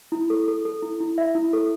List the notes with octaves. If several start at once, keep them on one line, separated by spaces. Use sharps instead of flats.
E4
A4
A4
A4
E4
E4
E5
E4
A4